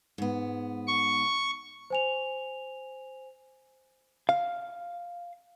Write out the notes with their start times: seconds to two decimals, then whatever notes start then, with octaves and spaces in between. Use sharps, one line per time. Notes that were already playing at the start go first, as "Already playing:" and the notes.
0.18 G#2 B3
0.87 C#6
1.90 C5 G#5 F7
4.29 F5